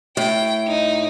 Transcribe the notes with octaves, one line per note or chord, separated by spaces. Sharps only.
A2 G5
D#4